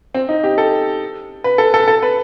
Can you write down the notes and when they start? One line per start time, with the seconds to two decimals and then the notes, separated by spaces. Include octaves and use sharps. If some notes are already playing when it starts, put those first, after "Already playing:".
0.14 C4
0.29 D#4
0.44 G4
0.58 A4
1.44 B4
1.58 A4
1.74 A4
1.88 A4
2.03 B4